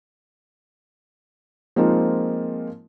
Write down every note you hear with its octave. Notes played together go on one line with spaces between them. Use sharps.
F3 G#3 A#3 C4 D#4 F4